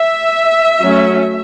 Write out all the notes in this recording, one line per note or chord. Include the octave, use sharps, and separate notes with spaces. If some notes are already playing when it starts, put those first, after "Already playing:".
Already playing: E5
F#3 A3 C#4